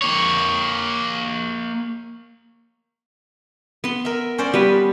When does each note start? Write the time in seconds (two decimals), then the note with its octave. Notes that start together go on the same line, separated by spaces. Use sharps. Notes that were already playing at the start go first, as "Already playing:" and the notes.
0.02 A#3 C#5
3.84 B3 C6
4.05 A#4 E5
4.38 C#4 C5 D5
4.54 G3 B3 B4